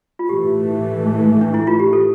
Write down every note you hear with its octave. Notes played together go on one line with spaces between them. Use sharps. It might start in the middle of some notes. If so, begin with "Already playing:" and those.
F4
A2 E3 A3 G4
D4
E4
F4
G4
A4